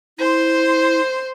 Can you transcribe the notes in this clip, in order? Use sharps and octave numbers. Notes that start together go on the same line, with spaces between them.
E4 C5 C6